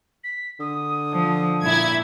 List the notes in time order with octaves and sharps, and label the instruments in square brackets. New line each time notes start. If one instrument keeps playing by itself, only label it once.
[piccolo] B6
[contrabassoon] D3 [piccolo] D#6
[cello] F3
[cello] A#2 [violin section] E4 G#6